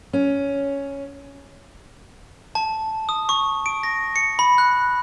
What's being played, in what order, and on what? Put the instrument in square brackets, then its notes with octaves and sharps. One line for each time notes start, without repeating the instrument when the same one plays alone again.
[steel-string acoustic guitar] C#4
[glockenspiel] A5
D#6
C#6
D7
A#6
C#7
B5
F#6